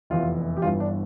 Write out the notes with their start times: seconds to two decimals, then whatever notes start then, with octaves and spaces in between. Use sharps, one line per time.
0.10 F1 E2 C3 E3 F4
0.57 G4
0.62 G1 G2 E3 F4
0.80 D4